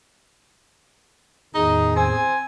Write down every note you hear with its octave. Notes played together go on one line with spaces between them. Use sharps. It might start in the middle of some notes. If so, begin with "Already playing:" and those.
E2 A2 D#3 D#4 G#4
C4 G#5